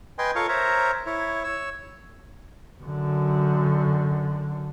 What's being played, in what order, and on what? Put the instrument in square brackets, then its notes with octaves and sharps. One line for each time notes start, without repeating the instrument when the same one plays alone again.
[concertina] B4 D#5 G5 G#5 C6
F4 A4 A#4 C#5 F5 C#6
A#4 C5 C#5 E5 A#5
E4 C#5
C#5 E6
[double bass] F#2 D3